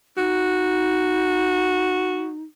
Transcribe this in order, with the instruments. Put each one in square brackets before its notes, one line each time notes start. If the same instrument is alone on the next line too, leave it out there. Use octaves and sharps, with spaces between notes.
[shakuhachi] D#4 [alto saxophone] F#4